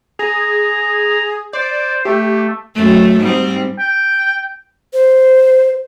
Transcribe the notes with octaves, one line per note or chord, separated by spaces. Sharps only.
G#4 A#5
C5 D5
A3 G4
F#2 A3
G#2 G3 C4
G5
C5